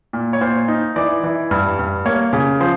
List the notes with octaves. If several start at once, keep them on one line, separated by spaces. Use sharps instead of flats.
A#2
C#5
A#2 C5
D#4
E3 D5
E3
G2
G2
A#3 C#5
C#3
F3 C5